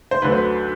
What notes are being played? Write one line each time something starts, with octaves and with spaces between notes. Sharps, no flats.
C5
D2 D3 F#3 B4
C5
B4